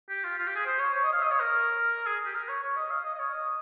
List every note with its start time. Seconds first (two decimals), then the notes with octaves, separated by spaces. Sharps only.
0.09 G4
0.24 F4
0.38 F4
0.47 G4
0.56 G#4
0.66 C5
0.79 C#5
0.94 C#5
1.04 D#5
1.13 F5
1.22 D#5
1.31 C#5
1.40 A#4
2.06 G#4
2.25 G4
2.34 A#4
2.49 C#5
2.63 C#5
2.76 D#5
2.90 F5
3.05 D#5
3.15 D#5
3.19 C#5
3.33 D#5